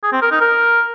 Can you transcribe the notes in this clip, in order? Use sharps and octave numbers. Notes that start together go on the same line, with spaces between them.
G#4
C4
A#4
D#4
A#4